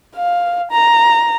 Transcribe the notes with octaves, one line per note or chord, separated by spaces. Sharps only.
F5
A#5